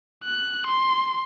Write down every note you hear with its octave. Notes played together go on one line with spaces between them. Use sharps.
F#6
C6